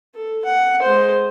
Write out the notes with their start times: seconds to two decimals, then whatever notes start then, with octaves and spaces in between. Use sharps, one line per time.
0.15 A4
0.45 F#5
0.82 G#3 C5